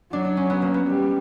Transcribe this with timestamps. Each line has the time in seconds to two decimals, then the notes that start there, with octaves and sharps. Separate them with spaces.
0.13 F#3 D4
0.25 D4
0.37 C#4
0.50 B3
0.62 A#3
0.74 B3
0.87 G3